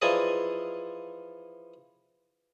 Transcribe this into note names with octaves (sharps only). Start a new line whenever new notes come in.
E3 F3 D#4 G#4 D5 D#5